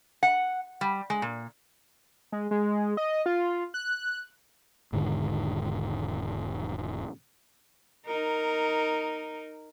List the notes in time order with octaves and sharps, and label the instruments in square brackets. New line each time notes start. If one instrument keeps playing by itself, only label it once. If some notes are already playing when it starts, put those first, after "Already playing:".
[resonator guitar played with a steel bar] F#5
G3
G#3
A#2
[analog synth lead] G#3
G#3
D#5
F4
F#6
[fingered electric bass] E1 G#2 D3 D#3
[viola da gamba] D#4 A#4